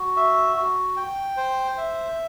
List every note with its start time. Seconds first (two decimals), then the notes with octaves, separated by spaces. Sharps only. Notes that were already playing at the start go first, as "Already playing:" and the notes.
Already playing: F#4
0.16 E5
0.57 F#4
0.97 G5
1.37 C5
1.77 E5